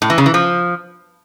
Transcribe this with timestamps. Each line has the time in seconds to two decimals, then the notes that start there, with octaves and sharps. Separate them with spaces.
0.02 A2
0.10 E3
0.18 C#3
0.26 E3
0.34 F3